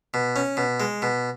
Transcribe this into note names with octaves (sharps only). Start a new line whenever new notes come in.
B2
C#4
B2
G#3
B2